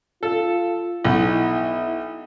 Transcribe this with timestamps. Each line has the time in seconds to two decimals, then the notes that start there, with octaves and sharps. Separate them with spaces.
0.23 F4 A4
1.05 B1 E4